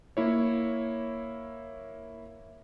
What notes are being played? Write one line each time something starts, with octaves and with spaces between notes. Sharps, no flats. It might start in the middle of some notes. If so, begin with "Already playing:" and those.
A#3 E4 C#5